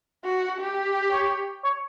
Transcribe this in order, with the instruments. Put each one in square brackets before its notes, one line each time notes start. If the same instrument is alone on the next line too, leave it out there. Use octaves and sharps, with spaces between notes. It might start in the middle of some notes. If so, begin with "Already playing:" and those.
[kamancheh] F#4
G4
[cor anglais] C#5
C#5